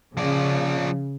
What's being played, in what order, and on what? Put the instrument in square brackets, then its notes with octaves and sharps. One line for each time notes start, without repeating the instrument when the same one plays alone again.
[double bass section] C#3 [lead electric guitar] F3 D5